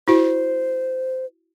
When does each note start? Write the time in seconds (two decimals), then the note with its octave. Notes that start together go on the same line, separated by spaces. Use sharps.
0.08 E4 F#4 C5